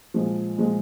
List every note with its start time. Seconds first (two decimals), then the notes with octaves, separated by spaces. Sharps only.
0.14 A#2 F3 G#3
0.58 A#2 F3 G#3